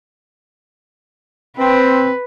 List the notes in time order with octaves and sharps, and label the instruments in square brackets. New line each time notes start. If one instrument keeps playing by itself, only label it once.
[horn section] C4 [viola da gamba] B4